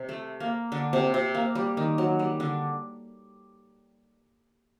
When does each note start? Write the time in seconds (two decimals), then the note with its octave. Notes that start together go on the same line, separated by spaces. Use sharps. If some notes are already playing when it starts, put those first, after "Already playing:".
Already playing: C3 C4
0.09 A3
0.40 A#3
0.72 D3 D4
0.93 C3 C4
1.14 C3 C4
1.34 A#3
1.55 G3
1.77 D#3
1.98 F#3
2.19 G3
2.40 D3 D4